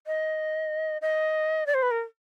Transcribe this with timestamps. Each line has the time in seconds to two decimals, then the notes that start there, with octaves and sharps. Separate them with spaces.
0.07 D#5
1.02 D#5
1.67 D5
1.74 C5
1.83 B4
1.91 A#4